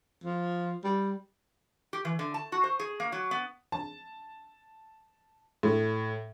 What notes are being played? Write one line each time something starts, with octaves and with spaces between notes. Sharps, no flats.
F3
G3
G4
E3
D3
A5
F#4
C5
G#4
A#3
F#3
B3
A5
A2